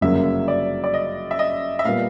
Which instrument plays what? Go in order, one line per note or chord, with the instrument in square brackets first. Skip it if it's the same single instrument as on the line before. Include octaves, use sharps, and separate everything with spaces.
[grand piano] G1 F#2 C#3 F#3 A#3 [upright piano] E5
[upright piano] D5
D5
D#5
E5
D#5
E5
[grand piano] A#2 G3 B3 [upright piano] F5